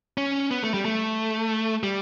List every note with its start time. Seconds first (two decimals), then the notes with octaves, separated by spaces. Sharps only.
0.18 C#4
0.51 B3
0.63 A3
0.74 G3
0.85 A3
1.83 G3